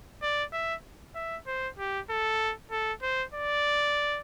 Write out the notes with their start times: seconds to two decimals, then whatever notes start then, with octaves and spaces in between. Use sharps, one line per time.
0.22 D5
0.53 E5
1.15 E5
1.47 C5
1.79 G4
2.10 A4
2.71 A4
3.02 C5
3.34 D5